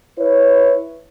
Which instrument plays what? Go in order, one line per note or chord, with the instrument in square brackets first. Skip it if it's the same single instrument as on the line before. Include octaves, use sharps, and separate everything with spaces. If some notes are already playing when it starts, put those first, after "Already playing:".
[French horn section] E4 B4 C#5